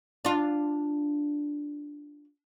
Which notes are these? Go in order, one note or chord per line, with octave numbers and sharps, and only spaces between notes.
D4 F4